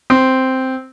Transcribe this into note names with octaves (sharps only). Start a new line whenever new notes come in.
C4